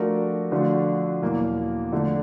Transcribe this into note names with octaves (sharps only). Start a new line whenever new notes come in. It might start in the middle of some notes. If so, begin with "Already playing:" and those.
Already playing: F3 A3 D4 F#4 A#4
D3 F3 A3 D4 F#4
E2 B2 F#3 A#3
D3 F3 A3 D4